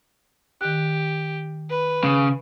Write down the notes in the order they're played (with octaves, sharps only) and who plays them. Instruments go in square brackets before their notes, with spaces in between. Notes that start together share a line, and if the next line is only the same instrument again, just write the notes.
[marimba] D#3 F#6 [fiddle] G4
[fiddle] B4
[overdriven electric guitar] C#3